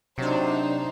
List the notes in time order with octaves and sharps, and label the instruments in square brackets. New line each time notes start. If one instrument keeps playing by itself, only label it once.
[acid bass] C3 [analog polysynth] F#3 D4 [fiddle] D#4 C5